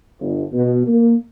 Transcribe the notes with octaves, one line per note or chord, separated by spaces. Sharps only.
G1
B2
A#3